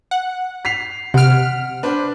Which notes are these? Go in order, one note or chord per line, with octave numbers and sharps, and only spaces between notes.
F#5
B6 C7 F7
C3 F#5 F6 D7
D4 B4 C5